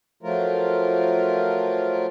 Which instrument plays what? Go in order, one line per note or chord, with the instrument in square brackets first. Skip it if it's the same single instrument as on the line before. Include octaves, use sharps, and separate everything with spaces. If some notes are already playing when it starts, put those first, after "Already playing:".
[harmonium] F3 F#3 A3 F4 A#4